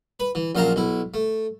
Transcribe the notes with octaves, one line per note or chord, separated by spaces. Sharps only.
B4
E3
A#1 F#2 C5 F5 A5 A#5
B1 E4
A3